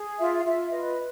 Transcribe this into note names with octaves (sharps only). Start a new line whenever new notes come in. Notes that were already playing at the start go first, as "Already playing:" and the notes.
Already playing: G#4
F4 E5
F5
F4 E5
B4 D#5